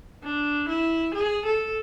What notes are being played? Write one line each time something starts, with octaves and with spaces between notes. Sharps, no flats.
D4
E4
G#4
A4